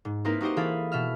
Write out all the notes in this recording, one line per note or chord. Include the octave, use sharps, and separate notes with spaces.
G#2
A#3 C4 D#4 E4 A#4 B4
D#4 F#4 G4 C5 D#5
E3 G#4 A4 F5 B5
B2 E5 F6